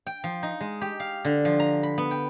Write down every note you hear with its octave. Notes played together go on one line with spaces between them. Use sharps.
G5
F3
D#4
G#3
G4
F5
D3
F3
A#5
B5
B3
G5